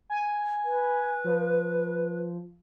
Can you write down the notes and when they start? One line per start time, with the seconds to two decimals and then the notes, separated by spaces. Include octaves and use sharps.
0.10 G#5
0.65 B4
1.24 F3